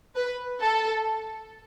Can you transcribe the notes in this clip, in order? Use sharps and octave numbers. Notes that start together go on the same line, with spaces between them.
B4
A4